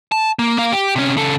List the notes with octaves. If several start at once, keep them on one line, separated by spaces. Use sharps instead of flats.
A5
A#3
A#3 F5
G4
C3 C#4
C#3 A4